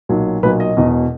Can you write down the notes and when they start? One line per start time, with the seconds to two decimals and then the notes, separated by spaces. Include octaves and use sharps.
0.09 B1 A#2 F#3
0.43 B1 A#2 F#3 B4
0.60 D#5
0.77 E1 E2 B2